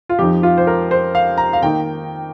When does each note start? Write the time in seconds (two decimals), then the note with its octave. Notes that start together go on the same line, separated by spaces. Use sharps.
0.09 F4
0.19 F2 F3 D#4 G4
0.43 F4
0.58 C5
0.67 A#4
0.91 C5
1.15 F5
1.38 A#5
1.53 F5
1.63 D#3 A#3 D#4 G5